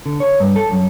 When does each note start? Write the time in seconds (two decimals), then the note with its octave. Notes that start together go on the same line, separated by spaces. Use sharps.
0.06 D3
0.20 C#5
0.40 G2
0.56 A4
0.71 F#2